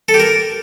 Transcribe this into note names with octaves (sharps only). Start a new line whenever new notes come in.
A4
G4
A#4